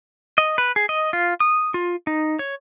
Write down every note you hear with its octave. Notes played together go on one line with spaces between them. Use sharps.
D#5
B4
G#4
D#5
F4
D#6
F4
D#4
C#5